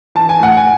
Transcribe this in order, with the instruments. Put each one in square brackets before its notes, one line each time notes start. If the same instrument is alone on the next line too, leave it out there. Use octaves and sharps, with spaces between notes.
[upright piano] E3 A5
G#5
A2 F#5
G#5